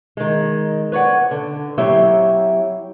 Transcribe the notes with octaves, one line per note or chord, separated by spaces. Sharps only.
D#3 G#3
B4 C#5 D5 F#5
D3
F#3 C4 E4 G4 C#5 E5